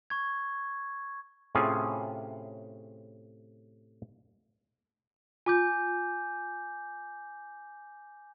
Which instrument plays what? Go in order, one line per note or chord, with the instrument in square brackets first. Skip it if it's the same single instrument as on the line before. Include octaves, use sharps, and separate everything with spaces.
[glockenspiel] C#6 G#6
[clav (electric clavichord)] A2 C3 C#4 F4 G#4
[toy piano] F4 [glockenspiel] G#5 D6 G6